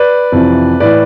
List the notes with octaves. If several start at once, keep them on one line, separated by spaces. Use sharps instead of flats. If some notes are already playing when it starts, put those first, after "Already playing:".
Already playing: B4 D5
F2 C3 E3
A2 E3 B4 D5